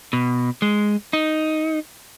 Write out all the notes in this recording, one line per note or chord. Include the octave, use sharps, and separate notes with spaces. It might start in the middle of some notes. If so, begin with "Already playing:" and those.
B2
G#3
D#4